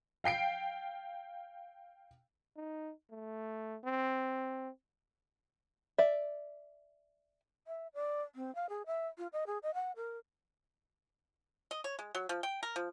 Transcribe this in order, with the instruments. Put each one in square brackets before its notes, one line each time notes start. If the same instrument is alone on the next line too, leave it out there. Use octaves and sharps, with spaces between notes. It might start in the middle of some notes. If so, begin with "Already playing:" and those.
[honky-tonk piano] F5 G5 C7 D7
[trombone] D#4
A3
C4
[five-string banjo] D5 E5
[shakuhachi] E5
D5
C4
F5
G#4
E5
F4
D#5
G#4
D#5
F#5
A#4
[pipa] D#5
C#5
G#3
F#3
F3
G5
A#4
F3